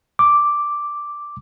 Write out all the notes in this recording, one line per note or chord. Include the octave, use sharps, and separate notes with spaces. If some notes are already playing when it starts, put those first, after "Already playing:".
D6